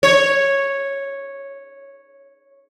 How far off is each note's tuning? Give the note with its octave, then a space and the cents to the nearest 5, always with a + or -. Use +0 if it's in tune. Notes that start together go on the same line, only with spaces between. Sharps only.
C#5 -5